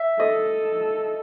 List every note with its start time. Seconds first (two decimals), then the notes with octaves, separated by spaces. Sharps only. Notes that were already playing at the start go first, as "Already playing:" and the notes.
Already playing: E5
0.19 A4 D#5